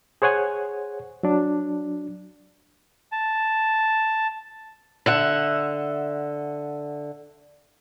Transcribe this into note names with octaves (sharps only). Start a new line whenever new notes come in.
G#4 C5 C#5 F#5 G#5
F#3 D4
A5
D3 E5 F#5